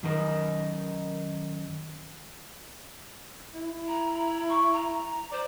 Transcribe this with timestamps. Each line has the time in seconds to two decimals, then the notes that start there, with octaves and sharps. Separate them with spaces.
0.03 F#2 D#3 D#4 A#4
3.54 E4
3.87 A#5
4.49 C#6
4.72 A#5
5.32 C5 D5